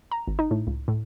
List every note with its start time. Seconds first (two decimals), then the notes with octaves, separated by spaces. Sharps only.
0.12 A#5
0.27 G#1
0.39 D#4
0.51 A2
0.67 C#2
0.88 A2